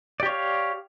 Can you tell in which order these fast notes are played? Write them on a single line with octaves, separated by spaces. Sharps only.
D5 G4 C#5 F5